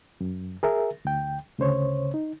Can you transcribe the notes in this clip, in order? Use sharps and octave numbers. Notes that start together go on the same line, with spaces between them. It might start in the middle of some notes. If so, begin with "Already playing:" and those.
F#2
G#4 A#4 E5
D2 G5
D2 C#3 C5 C#5
D#4